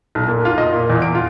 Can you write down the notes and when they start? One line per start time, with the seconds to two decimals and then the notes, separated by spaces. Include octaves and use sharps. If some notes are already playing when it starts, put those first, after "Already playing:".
0.15 B1
0.28 A#2
0.45 F4
0.58 D#5
0.73 A#2
0.90 E2
1.02 D7
1.15 F4